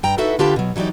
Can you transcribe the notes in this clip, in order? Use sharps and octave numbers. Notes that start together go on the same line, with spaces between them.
G2 G5 A#5
D#4 E4 F#4 A4 B4 E5
D3 F4 G4 B4 G5 A5
B2 F#3
E3 F#3 D#4 G4 D5